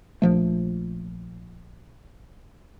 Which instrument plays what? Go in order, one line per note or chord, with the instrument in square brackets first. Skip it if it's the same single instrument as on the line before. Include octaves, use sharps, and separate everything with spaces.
[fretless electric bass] A#1 F3 A3